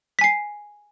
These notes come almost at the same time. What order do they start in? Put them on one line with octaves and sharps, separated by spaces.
B6 G#5 C7